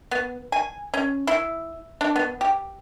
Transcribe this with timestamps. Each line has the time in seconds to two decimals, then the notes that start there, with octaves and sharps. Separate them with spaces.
0.11 B3
0.52 G#5
0.94 C#4
1.27 E4
2.01 D4
2.16 B3
2.41 G4